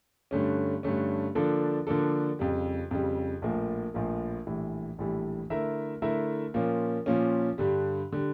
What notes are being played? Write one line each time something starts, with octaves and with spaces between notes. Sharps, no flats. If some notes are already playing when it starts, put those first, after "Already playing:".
G2 D3 A3 C#4
G2 D3 A3 C#4
D3 F3 A#3 D4 A4
D3 F3 A#3 D4 A4
F2 C#3 G3
F2 C#3 G3
A#1 A2 F3 A#3
A#1 A2 F3 A#3
A#1 A2 E3 G3
A#1 A2 E3 G3
D3 A3 E4 A#4 E5
D3 A3 E4 A#4 E5
A#2 F3 A#3 C#4
A#2 F3 A#3 C#4
G2 D3 G3
D3 G3